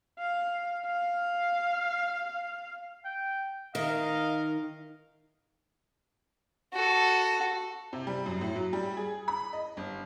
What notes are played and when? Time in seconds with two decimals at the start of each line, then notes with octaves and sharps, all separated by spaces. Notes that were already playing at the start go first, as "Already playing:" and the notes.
0.19 F5
0.86 F5
3.05 G5
3.75 D#3 A#4 D#5 F5
6.73 F#4 A4
7.93 C3
8.07 G3
8.26 F#2
8.41 A2
8.56 F#3
8.73 G3
8.97 G#4
9.28 B5
9.53 D#5
9.77 G1